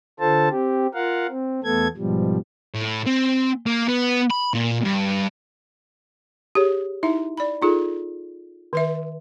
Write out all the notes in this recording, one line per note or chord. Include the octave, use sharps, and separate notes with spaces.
D3 F4 A4 C5 A5
C4 G4
F4 A#4 F5 F#5
C4
E2 A3 B3 A4 G#6
G#2 B2 F3 G3
A2
C4
A#3
B3
B5
A#2
G2
G4 G#4 C#5
D#4 E4 E5
D5 B5
D#4 F4 G#4 A4
D#3 B4 E5